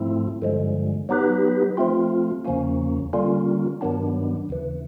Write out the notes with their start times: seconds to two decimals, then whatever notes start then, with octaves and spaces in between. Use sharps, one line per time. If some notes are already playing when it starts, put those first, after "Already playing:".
Already playing: G#2 F3 A3 C4 E4
0.42 G2 D3 F3 G#3
1.09 F#3 B3 D#4 G4 B4
1.77 F3 A3 C4 F4
2.45 E2 C#3 F3 A#3 C#4
3.13 D3 G3 A#3 C#4 F4
3.81 G2 D#3 F#3 B3 D4
4.49 D#2 C#3 E3